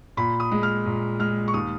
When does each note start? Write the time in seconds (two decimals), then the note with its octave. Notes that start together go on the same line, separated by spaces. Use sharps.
0.17 A#2 B5
0.40 D#6
0.51 G#3
0.63 F6
0.86 A#2
1.19 G#3 F6
1.48 C#6
1.54 D#2 D#6